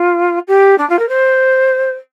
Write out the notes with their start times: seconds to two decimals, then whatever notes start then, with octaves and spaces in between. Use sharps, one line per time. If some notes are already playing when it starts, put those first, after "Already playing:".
Already playing: F4
0.47 G4
0.78 D4
0.89 F4
0.99 A#4
1.08 C5